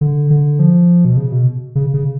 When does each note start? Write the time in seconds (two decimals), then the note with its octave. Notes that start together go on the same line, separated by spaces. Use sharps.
0.01 D3
0.30 D3
0.59 F3
1.05 B2
1.17 C#3
1.32 B2
1.75 C#3
1.94 C#3